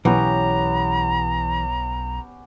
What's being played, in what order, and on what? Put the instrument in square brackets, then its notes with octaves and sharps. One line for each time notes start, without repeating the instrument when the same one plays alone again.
[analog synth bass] B1 [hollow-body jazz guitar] E3 [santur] B3 C#4 G4 [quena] A#5